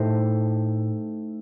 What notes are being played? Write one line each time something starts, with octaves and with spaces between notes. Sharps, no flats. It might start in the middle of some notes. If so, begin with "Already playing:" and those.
Already playing: A2 A3 D#4 G4 C5